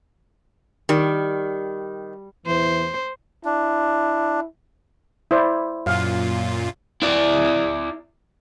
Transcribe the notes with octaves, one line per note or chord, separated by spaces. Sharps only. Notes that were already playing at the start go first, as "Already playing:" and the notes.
D#3 G3
E2 E3 C5
D4 E4
E4 C5 D5
F#2 A#2 F4 F#4 F5
E4 D5